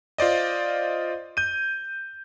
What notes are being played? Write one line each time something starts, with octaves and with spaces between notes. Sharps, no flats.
F4 C5 D5 D#5
G6 D#7